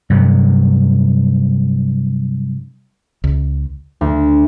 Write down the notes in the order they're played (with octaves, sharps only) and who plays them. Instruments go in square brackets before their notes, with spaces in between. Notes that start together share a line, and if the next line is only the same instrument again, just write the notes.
[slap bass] G2 C3 F#3
[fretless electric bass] C#2
[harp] D2